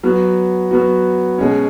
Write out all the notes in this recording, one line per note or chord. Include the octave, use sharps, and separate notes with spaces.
F#3 B3 F#4
F#3 B3 F#4
B2 G#3 C#4